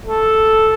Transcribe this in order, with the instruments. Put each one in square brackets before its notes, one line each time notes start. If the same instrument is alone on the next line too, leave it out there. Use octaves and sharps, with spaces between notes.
[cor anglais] A4